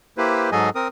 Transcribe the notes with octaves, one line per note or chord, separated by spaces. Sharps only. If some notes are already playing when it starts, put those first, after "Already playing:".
A#3 E4 G4 B4 C5
G#2 F#3 G#4 A4 D#5 G#5
C4 A#4 D#6